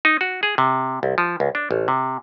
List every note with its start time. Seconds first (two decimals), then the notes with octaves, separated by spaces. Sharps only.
0.05 D#4
0.21 F#4
0.43 G#4
0.58 C3
1.03 C2
1.18 F3
1.40 C#2
1.55 D4
1.71 A1
1.88 C3